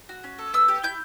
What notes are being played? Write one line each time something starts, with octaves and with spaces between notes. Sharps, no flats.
F#4
C#4
A4
B3 E6
G4
E4 G6